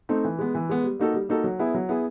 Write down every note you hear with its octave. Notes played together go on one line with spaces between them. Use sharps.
A3 C4 D#4
E3
G#3 B3
E3
G#3 B3
G3
A#3 D#4 F#4 A4
G3
A#3 D#4 F#4 A4
F#3
B3 E4 G#4
F#3
B3 E4 G#4